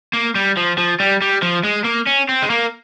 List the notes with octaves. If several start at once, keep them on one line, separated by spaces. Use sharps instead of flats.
A#3
G3
F3
F3
G3
G3
F3
G#3
A#3
C#4
C4
G#3
A#3